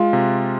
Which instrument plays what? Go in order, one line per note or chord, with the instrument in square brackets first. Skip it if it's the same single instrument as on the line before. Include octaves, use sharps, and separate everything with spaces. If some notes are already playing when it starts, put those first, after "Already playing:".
Already playing: [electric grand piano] G#3 [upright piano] F4
[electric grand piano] C3